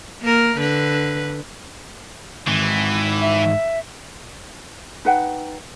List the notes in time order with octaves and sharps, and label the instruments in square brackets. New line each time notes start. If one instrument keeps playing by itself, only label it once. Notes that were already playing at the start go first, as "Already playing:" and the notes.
[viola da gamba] A#3 A#4
D3 B4
[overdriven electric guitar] G#2 D#3 [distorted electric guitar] E3
[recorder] E5
[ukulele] D#4 B4 F#5 G5